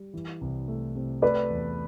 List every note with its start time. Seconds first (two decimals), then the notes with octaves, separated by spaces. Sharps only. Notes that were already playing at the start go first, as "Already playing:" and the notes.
Already playing: G3
0.14 E3
0.41 C2
0.68 A3
0.95 C3
1.22 A3 B4 D5
1.50 E2